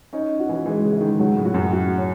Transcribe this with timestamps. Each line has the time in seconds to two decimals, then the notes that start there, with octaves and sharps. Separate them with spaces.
0.13 C#4 D#4
0.40 F#4
0.49 E3
0.66 E3 G#3
0.84 C#3
0.92 G#3
1.01 D#3
1.19 C#3 F#3
1.37 A2
1.45 F#4
1.54 F#2
1.72 F#4
1.98 C#4